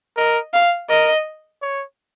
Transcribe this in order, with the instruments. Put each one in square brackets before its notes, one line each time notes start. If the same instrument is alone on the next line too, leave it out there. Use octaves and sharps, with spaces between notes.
[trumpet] A#4 [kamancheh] D#5
[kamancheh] F5
[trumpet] A#4 [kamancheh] D#5
[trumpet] C#5